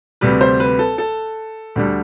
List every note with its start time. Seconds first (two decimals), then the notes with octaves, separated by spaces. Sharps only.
0.21 D2 C3 G3 B4
0.41 C5
0.60 B4
0.79 A4
0.98 A4
1.76 D2 D3 G3